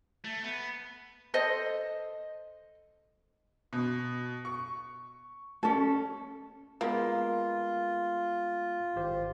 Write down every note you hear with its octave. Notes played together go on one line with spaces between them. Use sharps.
A3
B3
A4 C5 D#5
B2
C#6
C#4 A4
G#3 A#3 B3 F4 B5
G#1 G4 C5